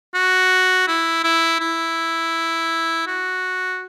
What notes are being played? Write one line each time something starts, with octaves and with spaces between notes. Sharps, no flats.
F#4
E4
E4
E4
F#4